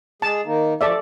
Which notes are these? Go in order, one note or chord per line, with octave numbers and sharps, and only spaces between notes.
G#3 G#4 A5
D#3 A#3 D#4
F3 A4 D5 E5